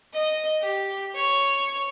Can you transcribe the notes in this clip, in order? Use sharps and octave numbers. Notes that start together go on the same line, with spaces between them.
D#5
G4
C#5